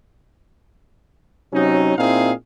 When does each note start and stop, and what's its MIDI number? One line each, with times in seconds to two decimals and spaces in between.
1.53 1.93 48
1.53 1.93 54
1.53 1.93 61
1.53 1.93 63
1.98 2.33 46
1.98 2.33 60
1.98 2.33 63
1.98 2.33 64
1.98 2.33 68
1.98 2.33 77